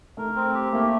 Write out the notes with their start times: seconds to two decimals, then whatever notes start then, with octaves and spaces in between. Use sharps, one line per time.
0.17 A3 A#4
0.36 C4
0.54 G4
0.73 A3 A#3